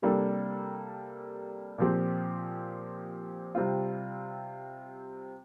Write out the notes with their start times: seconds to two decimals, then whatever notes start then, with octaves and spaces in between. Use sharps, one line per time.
0.02 C3 G3 A#3 D4 A4
1.78 A#2 F3 C4 G4
3.55 C3 G3 C4 F4